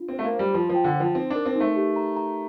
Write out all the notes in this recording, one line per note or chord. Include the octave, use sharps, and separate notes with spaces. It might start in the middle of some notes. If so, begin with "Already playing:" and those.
Already playing: D4 F4
C4 C5
A3
A#3
C5
G3
F3 C6
F3 G5
D3
F3 C5
C4 D#4
D4 A#4
C4
A3 D#4
G4
A#5
A#5